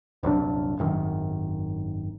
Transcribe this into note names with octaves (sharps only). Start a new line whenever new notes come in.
D#1 C2 F#2 D4
G#1 F#2 D#3